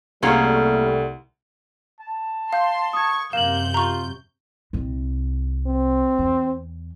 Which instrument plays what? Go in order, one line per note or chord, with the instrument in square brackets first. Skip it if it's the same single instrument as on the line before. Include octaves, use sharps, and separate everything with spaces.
[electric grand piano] C2 [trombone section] G3 A3 [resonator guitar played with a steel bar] A#3 C#4 G#4
[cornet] A5
[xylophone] F5 G6 [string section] C6
[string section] C#6 [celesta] D#6 G#6
[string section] F#2 C3 G6 [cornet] A#3 [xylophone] F5 [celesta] E7 F#7
[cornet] F4 [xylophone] A#5 C#6
[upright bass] C2 C3
[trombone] C4
[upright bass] E2